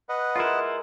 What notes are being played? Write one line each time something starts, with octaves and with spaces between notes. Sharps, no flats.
B4 D#5 F#5
G#3 E4 F4 A#4 D#6